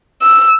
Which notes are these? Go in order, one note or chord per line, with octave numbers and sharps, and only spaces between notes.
E6